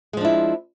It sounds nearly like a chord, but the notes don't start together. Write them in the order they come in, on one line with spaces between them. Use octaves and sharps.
G#3 F3 D4 E4